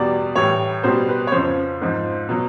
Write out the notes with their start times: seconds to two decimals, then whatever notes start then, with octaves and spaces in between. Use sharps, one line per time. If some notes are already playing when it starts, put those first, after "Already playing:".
Already playing: E2 B2 G3 D5
0.35 A2 E3 G3 C#5
0.83 B2 G3 C5
1.09 B4
1.27 C#5
1.32 F2 C#3 F3 C5
1.82 G#2 F3
2.29 B2 F#3